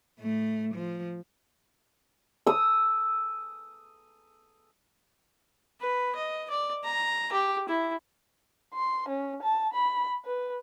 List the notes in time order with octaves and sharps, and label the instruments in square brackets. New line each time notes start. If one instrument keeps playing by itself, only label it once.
[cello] A2 A3
F3
[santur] D#6 E6
[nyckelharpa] B4
D#5
D5
A#5
G4
E4
[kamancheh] C6
C#4
A5
B5
B4